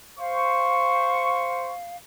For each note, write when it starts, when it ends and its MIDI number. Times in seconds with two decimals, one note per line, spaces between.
0.19 1.73 72
0.19 1.97 77
0.19 1.73 85